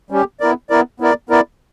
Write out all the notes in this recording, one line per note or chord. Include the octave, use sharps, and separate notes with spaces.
G3 C#4 G4
B3 E4 A#4 D5
B3 E4 A#4 D5
B3 E4 A#4 D5
B3 E4 A#4 D5